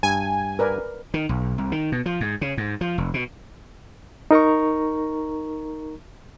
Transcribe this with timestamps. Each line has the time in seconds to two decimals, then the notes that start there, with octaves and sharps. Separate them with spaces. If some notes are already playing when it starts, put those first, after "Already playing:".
0.03 G2 G#5
0.59 A#4 B4 D5
1.14 D#3
1.29 B1
1.58 C2
1.72 D#3
1.92 B2
2.06 F3
2.21 G#2
2.41 C#3
2.57 G#2
2.81 F3
2.98 F1
3.14 B2
4.31 D#4 A#4 A#5 C#6